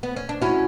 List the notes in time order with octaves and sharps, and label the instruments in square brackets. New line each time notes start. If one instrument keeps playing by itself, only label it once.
[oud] B3
C#4
D4
[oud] C#4 E4 [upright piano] F#4